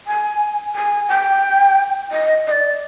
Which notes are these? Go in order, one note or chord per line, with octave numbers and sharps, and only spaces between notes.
G#5
G#5
G5
D#5
D#5
D5